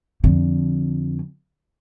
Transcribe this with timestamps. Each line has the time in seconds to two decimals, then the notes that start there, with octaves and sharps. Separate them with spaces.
0.24 F2 D3